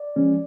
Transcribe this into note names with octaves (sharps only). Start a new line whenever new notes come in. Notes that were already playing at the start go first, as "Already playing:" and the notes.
Already playing: D5
F3 G#3 C#4